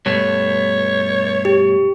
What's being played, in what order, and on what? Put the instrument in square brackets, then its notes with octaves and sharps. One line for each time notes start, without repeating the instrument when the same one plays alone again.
[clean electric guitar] G2 B2 A3 [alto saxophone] C#5
[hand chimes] G4